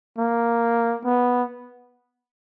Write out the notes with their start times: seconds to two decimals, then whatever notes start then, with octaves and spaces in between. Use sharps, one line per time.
0.18 A#3
1.05 B3